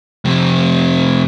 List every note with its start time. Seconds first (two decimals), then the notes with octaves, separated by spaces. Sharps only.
0.25 F2 C3